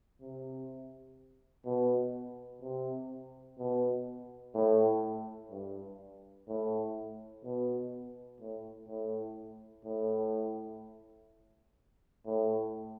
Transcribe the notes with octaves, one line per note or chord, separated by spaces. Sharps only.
C3
B2
C3
B2
A2
G2
A2
B2
A2
A2
A2
A2